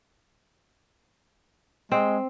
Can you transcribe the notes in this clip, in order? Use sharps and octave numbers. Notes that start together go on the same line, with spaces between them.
G#3 C4